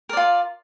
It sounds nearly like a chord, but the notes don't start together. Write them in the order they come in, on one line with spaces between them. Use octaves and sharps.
A#4 D5 F4